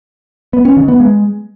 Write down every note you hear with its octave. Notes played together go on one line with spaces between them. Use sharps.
B3
C#4
D#3
B3
G#3